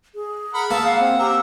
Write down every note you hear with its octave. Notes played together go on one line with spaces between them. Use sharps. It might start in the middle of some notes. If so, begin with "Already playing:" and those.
G#4
A#4 F#5 B5
A#3 E5 A5
F5 F#5
C4
G4 A#4 E6